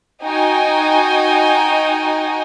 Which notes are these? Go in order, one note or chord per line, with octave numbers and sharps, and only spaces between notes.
D#4 F#4 G5 G#5